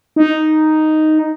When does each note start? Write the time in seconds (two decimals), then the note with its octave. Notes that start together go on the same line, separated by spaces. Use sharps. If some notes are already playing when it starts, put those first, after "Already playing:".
0.16 D#4